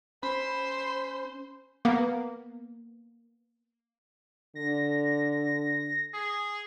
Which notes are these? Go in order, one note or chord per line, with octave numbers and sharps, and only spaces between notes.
C#4 C5 B5
A#3 B3
D3 A#6
G#4